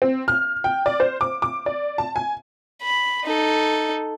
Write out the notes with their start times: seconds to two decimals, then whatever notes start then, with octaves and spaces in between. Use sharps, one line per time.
0.02 C4
0.28 F6
0.64 G5
0.86 D5
1.00 C5
1.21 D6
1.42 D6
1.66 D5
1.98 A5
2.16 G#5
2.82 B5
3.25 D#4 A4